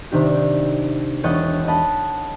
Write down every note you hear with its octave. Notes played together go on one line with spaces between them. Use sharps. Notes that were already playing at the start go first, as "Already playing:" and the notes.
C3 D#3 D4 G4
E1 C#5 D#5 F#5 G5 A6
D#5 F#5 A5 B5